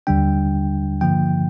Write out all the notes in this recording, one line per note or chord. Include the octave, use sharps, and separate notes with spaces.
D#2 D3 G3 D4 G5
G2 D3 F3 A#3 G5